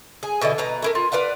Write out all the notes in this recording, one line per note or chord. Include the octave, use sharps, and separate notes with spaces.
G#4
B2 D3 E3 D#5
B2 B4 A#5
A3 E4 A#4
F4
B4 D5 F5 F#5